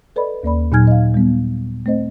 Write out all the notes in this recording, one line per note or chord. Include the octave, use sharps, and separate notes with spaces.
A4 B4 D5 D#5 B5
D#2 A#3 D5 B5
A#2 F#3 D#4 G#5 F6 G#6
D#5 F5
G3 B3
A3 C4 C5 D#5